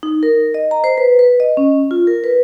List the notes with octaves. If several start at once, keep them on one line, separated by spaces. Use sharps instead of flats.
D#4
A#4
D#5
A#5
C5
B4
B4
D#5
C#4
F4
A#4
B4